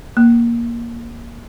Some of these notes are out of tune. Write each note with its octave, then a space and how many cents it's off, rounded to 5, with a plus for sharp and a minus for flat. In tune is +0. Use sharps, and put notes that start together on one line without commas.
A#3 +10